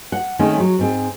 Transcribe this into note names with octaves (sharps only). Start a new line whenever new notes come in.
F#5
D#3 G#3 A3 C4 C#4
F#3
G#2 C4 G#4